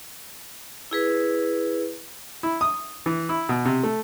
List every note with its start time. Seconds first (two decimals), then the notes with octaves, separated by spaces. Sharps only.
0.91 E4 G#4 B4
2.43 E4
2.61 D#6
3.06 E3
3.29 E4
3.49 B2
3.65 C3
3.83 A3